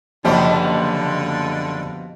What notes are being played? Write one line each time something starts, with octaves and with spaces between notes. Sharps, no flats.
F#1 B2 D3 F3 G4